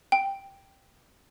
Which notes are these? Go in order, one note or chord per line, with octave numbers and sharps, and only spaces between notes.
G5